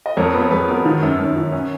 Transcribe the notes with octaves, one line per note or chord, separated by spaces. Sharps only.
D#5
F2 A#4 C#5
B3
C#5
F2 G#4 B4
B3 F#4 A#4
D#3
F#2
F#2
D#3
C#4